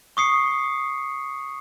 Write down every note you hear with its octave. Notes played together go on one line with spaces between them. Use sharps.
C#6 D#6 C7 C#7